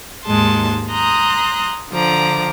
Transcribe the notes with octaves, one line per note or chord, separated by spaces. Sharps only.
D#2 G#2 G#3 A5 C6
A#5 C6 D#6 F#6 G6
D3 F3 A#5 D6